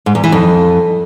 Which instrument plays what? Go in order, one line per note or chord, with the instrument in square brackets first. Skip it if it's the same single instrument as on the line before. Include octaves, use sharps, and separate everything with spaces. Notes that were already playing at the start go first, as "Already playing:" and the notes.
[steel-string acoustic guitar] G#2
E2
E3
F2